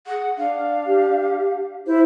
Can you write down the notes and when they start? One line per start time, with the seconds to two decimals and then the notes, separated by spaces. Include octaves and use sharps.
0.07 G#4 F#5
0.37 D4 F5
0.86 G4
1.87 E4 C5